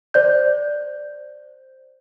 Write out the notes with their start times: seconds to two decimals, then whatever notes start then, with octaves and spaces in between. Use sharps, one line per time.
0.14 C5 D5 G6